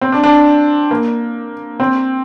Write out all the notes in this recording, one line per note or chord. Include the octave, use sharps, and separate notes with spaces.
C4
D4
D4
A#3
C4